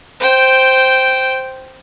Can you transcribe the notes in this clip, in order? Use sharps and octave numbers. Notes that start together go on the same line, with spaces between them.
C5 G5